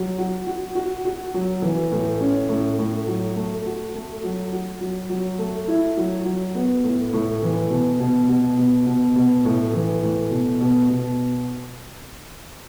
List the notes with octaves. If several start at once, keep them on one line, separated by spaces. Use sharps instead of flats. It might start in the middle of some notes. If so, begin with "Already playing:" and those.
Already playing: F#3
F#4
F#4
F#4
F#4
F#3
E3
A2
C#4
A2
A2
F#3
A3
F#4
A3
F#3
F#4
F#3
F#3
A3
E4
F#3
F#3
B3
A2
A2
E3
B2
B2
B2
B2
B2
B2
A2
E3
A2
B2
B2
B2